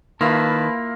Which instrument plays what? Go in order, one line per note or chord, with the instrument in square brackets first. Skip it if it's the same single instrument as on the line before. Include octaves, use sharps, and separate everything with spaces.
[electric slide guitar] D#3 [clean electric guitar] A#3 [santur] E4 F4 [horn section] B4 A5